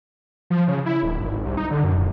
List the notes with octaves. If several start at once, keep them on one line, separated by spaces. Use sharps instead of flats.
F3
C#3
E4
D1
G#1
G#1
C2
D#4
D3
F#2
D#1